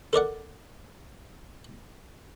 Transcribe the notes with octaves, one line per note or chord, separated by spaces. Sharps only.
A4 A#4 D5 F#5